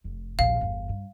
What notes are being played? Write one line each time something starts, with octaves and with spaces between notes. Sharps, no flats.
F1 F2
A#1 D#2 F5
G1 E2
G2